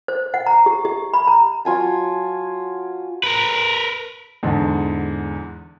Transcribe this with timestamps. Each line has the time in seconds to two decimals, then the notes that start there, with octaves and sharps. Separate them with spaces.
0.08 C5
0.34 F#5
0.47 A#5
0.66 G4
0.85 G4
1.14 B5
1.27 A#5
1.65 F#3 F4 G#5 A5
3.24 A#4 B4
4.43 E2 G#2 D3